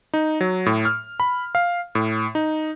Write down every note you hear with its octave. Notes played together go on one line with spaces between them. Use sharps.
D#4
F#3
A2
F6
B5
F5
A2
D#4